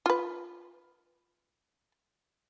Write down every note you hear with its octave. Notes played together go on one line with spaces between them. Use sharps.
F4 B4